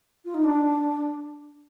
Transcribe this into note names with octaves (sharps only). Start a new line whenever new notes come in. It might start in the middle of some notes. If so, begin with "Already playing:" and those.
F4
D#4
D4